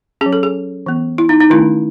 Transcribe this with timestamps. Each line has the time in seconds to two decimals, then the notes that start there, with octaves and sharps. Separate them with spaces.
0.21 C#4 G#4
0.26 F#3
0.33 A4
0.43 G#4
0.86 E3 B3
1.18 E4
1.29 D#4
1.40 D#4
1.50 D#3 A3 C#4 E4